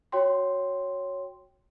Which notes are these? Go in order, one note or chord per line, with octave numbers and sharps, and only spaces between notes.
F#4 C#5 G5 C6